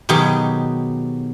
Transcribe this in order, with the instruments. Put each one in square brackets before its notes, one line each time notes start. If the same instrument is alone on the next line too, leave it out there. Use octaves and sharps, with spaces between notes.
[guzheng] B2 D#3 F#3 G4 G#4